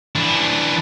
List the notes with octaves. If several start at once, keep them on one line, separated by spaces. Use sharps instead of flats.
E3 D4